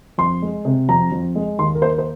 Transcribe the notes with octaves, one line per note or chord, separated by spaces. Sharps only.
F2 C6
G#3
C3
F2 A#5
F2
G#3
D#2 C6
A#4
A#3 C5
C5